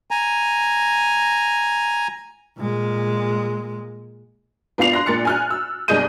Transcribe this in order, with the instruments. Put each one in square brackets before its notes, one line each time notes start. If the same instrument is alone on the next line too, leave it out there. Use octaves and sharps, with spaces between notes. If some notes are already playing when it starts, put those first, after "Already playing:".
[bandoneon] G#5 A#5
[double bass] A#2 G#3
[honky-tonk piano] A#1 B3 F4 D5 C7 F7
C6 F#6 A#6
A#1 A#2 A6 C#7
G#5 F6 F#6
E6
G1 C2 G#4 D#5 G6 D#7